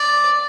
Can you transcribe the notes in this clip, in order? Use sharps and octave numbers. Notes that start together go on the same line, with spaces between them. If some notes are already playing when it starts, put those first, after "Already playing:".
Already playing: D5